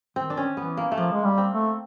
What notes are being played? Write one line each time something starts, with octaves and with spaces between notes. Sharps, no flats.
D#3 C4
D4
C#4
E3 B3
A#3
A3
F3 A#3
G#3
G3
C4
A3